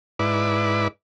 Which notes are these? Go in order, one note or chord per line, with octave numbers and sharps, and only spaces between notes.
G#2 E4 B4 D5